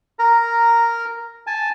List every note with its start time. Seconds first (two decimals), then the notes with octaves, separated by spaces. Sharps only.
0.19 A#4 A#5
1.47 G#5 A5